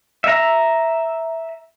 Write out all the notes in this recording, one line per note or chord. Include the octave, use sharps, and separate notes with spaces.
E5 A#5